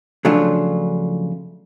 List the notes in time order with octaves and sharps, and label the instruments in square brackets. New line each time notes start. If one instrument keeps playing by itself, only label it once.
[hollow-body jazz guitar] C#3 F3 F#3 A3 D4 F4